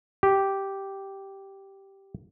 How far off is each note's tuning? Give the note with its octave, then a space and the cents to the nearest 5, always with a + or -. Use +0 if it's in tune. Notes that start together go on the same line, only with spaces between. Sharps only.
G4 -5